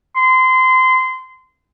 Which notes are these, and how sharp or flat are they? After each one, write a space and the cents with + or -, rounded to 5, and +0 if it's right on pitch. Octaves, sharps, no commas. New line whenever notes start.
C6 -25